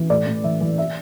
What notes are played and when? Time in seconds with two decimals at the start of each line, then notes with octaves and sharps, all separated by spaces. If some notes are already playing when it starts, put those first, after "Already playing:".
Already playing: E3
0.10 A2 D5
0.27 A2
0.44 E3 E5
0.61 E3
0.78 E5